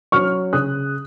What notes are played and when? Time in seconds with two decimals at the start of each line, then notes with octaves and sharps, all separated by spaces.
0.12 F#3 C#4 C#6 F6
0.53 C#3 D#6 F#6